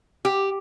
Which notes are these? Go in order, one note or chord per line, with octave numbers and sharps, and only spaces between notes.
G4